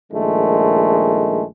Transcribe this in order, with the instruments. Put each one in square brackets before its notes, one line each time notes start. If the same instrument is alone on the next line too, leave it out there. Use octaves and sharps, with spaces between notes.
[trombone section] A#1 D#3 G#3 A3